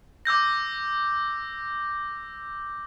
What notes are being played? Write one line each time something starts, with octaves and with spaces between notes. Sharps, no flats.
D6 E6 G6 A#6